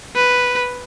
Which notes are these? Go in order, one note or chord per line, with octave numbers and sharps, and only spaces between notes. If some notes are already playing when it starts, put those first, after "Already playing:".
B4